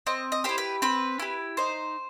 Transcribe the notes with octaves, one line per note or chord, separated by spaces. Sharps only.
C4 D#5
D#5
E4 G4 C5
B4
C4 B4
E4 G4
D#4 C5